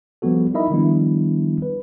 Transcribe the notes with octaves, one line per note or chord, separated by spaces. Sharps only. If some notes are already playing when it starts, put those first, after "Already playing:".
F3 G3 B3 F#4 A4
D#4 E4 A#4 D#5 E5 B5
D#3 F3 G3 B3 D4 E4
B4